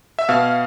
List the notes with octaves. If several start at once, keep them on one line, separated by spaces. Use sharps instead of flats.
E5
B2 F5